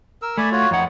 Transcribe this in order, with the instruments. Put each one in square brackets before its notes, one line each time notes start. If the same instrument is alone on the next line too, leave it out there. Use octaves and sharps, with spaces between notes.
[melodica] A#4 E6
[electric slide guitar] A3 [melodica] D5 G#5 B5
[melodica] F4 F#4 C#5
[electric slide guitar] F2 F#5 [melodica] D#4 C#5